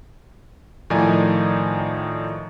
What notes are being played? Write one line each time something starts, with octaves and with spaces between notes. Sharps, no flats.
A2 D#3 F3 D#4 D5 G#5